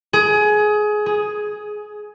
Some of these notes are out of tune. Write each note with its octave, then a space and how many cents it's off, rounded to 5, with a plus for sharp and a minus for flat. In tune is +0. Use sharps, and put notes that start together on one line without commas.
G#4 +20
G#4 +5